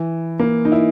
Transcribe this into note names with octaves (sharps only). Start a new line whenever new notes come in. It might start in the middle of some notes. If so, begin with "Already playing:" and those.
Already playing: E3
A#3
D#4
E4